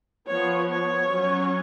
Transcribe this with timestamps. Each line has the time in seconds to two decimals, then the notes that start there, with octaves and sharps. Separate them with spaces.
0.27 F3 B3 C#5
0.68 C#5
1.08 F#3 C#4